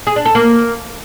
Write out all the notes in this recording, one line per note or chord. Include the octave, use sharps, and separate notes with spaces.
G#4
D4
A4
A#3